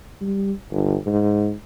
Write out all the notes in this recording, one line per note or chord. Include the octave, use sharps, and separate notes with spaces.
G3
G1
G#2